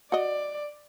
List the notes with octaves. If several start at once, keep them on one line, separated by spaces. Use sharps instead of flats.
F#4 D5 D#5